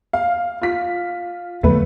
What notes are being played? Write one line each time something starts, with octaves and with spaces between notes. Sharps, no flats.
F5
F4 B6
E2 D3 F#3 A3 B4